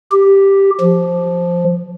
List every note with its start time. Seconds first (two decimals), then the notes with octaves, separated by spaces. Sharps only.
0.11 G4
0.80 F3